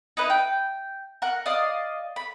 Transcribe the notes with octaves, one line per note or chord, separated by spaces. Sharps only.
D#4 E4 B4 D#5
G5
A#4 F#5
D5 D#5 F5 D#6
B5